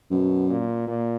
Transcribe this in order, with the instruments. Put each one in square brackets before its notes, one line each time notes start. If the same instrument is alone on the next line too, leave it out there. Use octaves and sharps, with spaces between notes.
[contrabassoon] F#2 [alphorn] B2
[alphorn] A#2
A#2